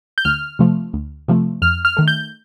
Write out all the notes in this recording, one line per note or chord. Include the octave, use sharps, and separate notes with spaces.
G6
D2 F6
C3 F3 A3
D2
C3 F3 A3
F2 F6
F6
D#3 A3
G6